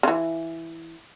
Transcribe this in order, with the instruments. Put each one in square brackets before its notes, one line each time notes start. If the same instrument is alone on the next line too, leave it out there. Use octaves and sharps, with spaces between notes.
[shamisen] C#3 E3